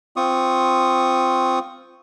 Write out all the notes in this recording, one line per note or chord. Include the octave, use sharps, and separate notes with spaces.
C4 F4 C#6 D#6